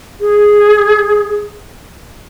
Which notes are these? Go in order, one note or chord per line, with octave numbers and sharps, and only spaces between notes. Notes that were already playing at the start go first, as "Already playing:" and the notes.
G#4